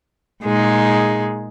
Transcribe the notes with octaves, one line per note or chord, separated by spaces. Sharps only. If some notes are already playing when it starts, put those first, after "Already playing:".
A#2 G#3 D#4 G#4